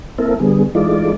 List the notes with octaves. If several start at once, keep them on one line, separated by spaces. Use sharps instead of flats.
A#3 C4 E4 A4 A#4
D3 G3 B3 G#4
E3 G#3 A3 D#4 F4 D5